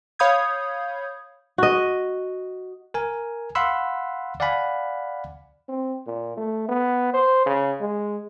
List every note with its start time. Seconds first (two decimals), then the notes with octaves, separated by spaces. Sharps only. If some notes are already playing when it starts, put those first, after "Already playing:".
0.19 C#5 F5 B5 D#6 G6 G#6
1.58 F#4 D#5
2.94 A#4 G#5
3.55 F5 F#5 B5 C6 E6
4.40 D5 F5 F#5 G#5 B5
5.69 C4
6.07 A#2
6.37 A3
6.69 B3
7.14 C5
7.46 C#3
7.80 G#3